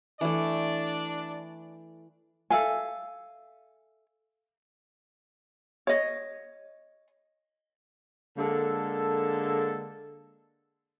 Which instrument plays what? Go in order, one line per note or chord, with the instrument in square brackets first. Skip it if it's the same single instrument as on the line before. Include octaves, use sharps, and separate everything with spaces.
[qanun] E3 A3 [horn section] D4 D5
[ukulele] A4 E5 F5 G#5
C#5 D#5
[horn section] D3 G#3 A#3 A4